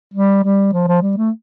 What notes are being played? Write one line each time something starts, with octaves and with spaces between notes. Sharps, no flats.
G3
G3
F3
F3
G3
A3